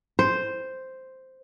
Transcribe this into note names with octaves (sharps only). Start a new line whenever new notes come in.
C5